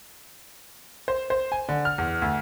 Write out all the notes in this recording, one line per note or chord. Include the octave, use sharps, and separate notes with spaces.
C5
C5
G#5
D3
F6
E2
D2